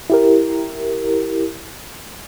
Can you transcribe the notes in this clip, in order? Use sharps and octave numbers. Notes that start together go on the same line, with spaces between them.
E4 G4 A#4